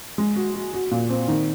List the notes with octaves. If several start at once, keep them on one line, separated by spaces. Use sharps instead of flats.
G#3
F#4
F#4
F#4
A#2
C4
D#3